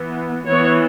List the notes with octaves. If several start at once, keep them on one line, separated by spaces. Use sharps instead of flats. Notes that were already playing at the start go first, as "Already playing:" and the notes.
Already playing: E3 B3
E3 B3 C#5